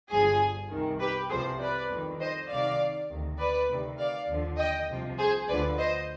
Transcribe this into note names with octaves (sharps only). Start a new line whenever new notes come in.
G1 G2 F3 G#4
C2 C3 D#3
G4 B4
C2 C3 F3 G#4 C5
B4 D5
F2 D#3
C5 D#5
C2 C3 D#3 D5 F5
D2 C3 D#3
B4 D5
D2 C3 D#3
D5 F5
D#2 D3 F3
D#5 G5
C2 C3 F3
G#4 C5
D2 D3 F3 B4 D5
C5 D#5